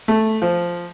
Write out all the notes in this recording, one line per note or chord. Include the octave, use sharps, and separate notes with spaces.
A3
F3